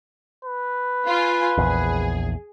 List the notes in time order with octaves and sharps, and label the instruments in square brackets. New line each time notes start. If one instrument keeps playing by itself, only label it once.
[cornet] B4
[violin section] F4 G#5
[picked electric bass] A#1 E2 [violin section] G#4